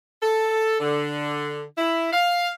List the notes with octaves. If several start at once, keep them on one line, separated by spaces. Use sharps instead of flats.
A4
D3
E4
F5